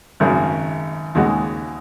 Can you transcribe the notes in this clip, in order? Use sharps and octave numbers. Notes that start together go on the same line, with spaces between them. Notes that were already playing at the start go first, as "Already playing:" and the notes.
G#1 F#2 C#3 A#3
D#2 C#3 G#3 F#4